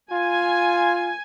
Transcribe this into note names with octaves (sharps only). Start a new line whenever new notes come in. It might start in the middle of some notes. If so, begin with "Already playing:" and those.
F4 G#5